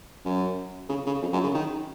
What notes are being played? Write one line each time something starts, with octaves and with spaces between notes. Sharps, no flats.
F#2
C#3
C#3
F2
F#2
C#3
D#3